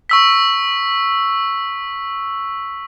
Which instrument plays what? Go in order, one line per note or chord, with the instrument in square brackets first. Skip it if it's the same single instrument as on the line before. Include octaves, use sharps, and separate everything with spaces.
[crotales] C#6 E6 B6